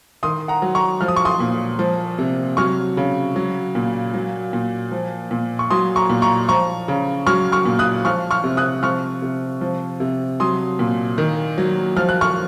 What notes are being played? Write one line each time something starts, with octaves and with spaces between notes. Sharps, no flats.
D#3 C6 D#6
F#5 A#5
F#3
A#5 C#6
F3 F6
D#6
C#6
C6 D#6
A#2
F3
C3
F#3 C#6 F6
C#3
F#3
A#2
F#3
A#2
F3
A#2
C#6
F#3 C6 D#6
A#5 C#6
A#2
A#5 C#6
F3 A#5 C#6
C#3
F#3 C#6 F6
C#6 F6
A#2
D#6 F#6
F3 C#6 F6
C#6 F6
C3
D#6 F#6
F3 C#6 F6
C3
F3
C3
F#3 C6 D#6
A#2
D#3
F#3
F3 F6
F#6
C#6 F6